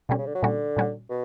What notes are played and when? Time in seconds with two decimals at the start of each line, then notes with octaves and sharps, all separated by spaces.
0.09 B2 D3 G3 C#4
0.18 C#3
0.26 D3
0.35 F#3
0.43 A#2 D3 G3 C#4 F#4
0.76 A#2 G3 C#4 F#4
1.10 B2